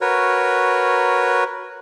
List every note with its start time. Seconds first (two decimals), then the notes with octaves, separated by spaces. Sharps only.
0.01 F#4 A#4 B4 C#5